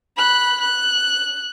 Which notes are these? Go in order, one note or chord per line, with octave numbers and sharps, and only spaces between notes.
B5 F#6
F#6